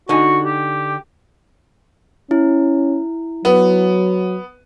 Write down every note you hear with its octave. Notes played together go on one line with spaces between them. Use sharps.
D3 D#4 F#4 G#5
G4
C#4 E4
F#3 B3